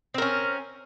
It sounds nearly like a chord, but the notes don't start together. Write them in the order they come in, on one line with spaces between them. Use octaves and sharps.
C4 A#4 C#4